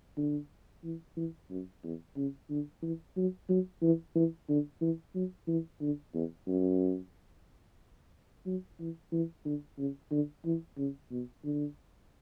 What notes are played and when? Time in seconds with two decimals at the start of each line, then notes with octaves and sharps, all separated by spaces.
0.17 D3
0.84 E3
1.17 E3
1.50 F#2
1.83 E2
2.16 C#3
2.50 D3
2.82 E3
3.17 F#3
3.49 F#3
3.82 E3
4.15 E3
4.49 D3
4.81 E3
5.15 F#3
5.48 E3
5.81 D3
6.14 E2
6.47 F#2
8.46 F#3
8.79 E3
9.13 E3
9.45 D3
9.78 C#3
10.11 D3
10.45 E3
10.78 C#3
11.11 B2
11.44 D3